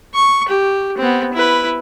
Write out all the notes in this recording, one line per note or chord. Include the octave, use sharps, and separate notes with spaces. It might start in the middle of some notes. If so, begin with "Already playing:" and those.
C#6
G4
B3 C4
E4 B4